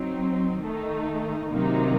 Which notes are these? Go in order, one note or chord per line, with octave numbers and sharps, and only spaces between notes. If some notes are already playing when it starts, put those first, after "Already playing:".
Already playing: F#3 C4 D#4
D#3 A3 D#4
C3 D#3 F#3 A#3 D#4